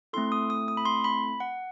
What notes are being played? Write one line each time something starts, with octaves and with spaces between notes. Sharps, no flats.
A3 C4 E4 A4 C6
D#6
D#6
D#6
B5
C6
B5
F#5